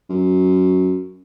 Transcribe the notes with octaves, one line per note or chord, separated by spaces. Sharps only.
F#2